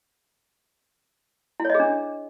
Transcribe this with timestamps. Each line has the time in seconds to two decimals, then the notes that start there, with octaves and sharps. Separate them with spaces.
1.60 E4
1.65 C#5
1.70 D#5
1.75 G#4
1.80 D4